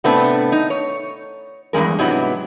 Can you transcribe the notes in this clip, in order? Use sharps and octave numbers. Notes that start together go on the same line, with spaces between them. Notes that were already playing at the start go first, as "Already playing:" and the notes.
A2 C3 A3 B3 C4 D4
D#4
C#5
E2 G2 D#3 G#3 A#4
G#2 C3 F#3 B3 E4